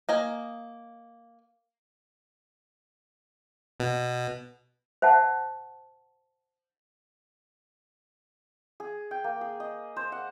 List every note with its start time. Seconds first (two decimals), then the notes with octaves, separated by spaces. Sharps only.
0.09 A#3 D#5 G#5
3.80 B2
5.02 C5 E5 F#5 A5
8.80 G#4
9.11 G5
9.24 A#3
9.41 G#4
9.60 D#5
9.96 C5
10.12 F#5